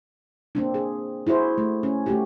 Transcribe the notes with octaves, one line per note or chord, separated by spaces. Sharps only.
A#3 C4 D4
G#4
E4 F#4 G#4 C5
A3
C#4
A3 F#4 G4